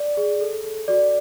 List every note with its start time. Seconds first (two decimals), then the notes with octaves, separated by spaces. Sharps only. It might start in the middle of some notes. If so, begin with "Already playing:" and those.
Already playing: D5
0.17 G#4
0.41 A4
0.64 A4
0.88 F#4 D5